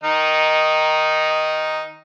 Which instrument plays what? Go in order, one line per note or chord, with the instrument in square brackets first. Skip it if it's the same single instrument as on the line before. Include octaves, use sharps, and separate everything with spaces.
[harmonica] D#3 D#4